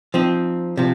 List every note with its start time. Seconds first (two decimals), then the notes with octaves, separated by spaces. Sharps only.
0.14 F3 C4 D#4
0.77 C3 F3